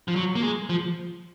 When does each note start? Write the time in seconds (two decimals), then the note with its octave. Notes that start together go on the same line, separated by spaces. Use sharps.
0.08 F3
0.16 F#3
0.36 A#3
0.42 G#3
0.70 F3